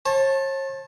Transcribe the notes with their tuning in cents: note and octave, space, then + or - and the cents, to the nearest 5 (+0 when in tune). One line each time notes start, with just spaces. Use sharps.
C#5 -45 A5 +0